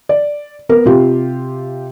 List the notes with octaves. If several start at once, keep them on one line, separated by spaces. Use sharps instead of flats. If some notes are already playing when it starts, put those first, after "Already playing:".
D5
B3 A#4
C3 F4 G4